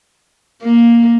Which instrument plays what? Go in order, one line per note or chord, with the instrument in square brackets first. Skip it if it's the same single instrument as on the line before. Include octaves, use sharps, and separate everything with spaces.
[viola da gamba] A#3